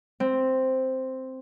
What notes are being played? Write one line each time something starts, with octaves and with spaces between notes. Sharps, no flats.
C4